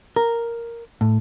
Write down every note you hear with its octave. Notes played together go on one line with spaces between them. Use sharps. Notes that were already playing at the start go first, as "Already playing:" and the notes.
A#4
A2